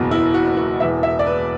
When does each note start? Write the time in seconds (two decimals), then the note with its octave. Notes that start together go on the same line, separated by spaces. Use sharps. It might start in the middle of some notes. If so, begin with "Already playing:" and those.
Already playing: F#1 E2 B2
0.11 E4
0.34 F#4
0.57 F#4
0.80 E1 E2 E3 E5
1.03 E5
1.19 D5
1.27 B4